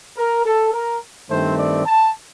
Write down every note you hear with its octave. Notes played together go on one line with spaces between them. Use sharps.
A#4
A4
A#4
G2 D#3 A3 C4 C5
D5
A5